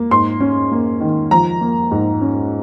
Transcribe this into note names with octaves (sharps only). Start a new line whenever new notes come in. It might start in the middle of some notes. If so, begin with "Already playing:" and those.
Already playing: A#3
G#2 C6
C#4
A#3
D#3
F3 A#5
A#3
G#2
C#4